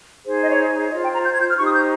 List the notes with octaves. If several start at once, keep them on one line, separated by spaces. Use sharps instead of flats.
D#4 G#4 C5
D#5
C#5
F4 C5 D#5
G5
A#5
G6
G#6
G6
F6
D#4 G4 C5 C#6
D#6
G6